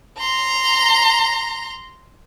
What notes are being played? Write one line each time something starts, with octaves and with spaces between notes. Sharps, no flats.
A#5 C6